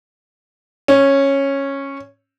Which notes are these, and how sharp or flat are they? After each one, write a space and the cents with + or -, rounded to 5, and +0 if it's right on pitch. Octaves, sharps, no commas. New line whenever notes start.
C#4 -10